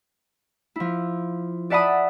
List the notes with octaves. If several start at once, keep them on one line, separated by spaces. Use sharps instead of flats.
F3 E4
D5 E5 F#5 A5 B5 D#6